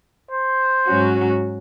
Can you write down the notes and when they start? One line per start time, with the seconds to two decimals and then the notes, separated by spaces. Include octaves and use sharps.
0.31 C5
0.86 G#2 F#3 C#4 F#4